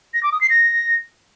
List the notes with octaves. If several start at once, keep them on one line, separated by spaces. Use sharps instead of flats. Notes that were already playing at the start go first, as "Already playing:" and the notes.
A#6
D6
D#6
C7
A#6